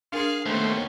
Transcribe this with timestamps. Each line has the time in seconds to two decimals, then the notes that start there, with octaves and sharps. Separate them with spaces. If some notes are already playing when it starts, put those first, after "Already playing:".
0.12 D4 G#4 A#4 F5
0.46 D#2 A3 B3 C#4 C5